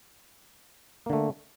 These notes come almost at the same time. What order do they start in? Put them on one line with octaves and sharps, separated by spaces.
A#3 D3 A3